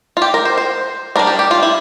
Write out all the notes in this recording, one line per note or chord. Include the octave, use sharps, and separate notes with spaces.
F4
G4
A#4
C5
C5
G3 D4 A#4
G4
G4
F4
E4